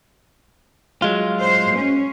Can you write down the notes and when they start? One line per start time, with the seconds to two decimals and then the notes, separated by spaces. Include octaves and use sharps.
1.02 F#3 G#3 F4
1.42 C5
1.78 C#4